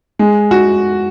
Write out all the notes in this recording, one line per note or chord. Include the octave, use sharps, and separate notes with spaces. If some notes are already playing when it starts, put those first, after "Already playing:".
G#3
F#4